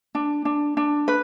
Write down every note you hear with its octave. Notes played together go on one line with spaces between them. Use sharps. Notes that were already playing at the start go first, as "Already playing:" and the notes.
D4
D4
D4
B4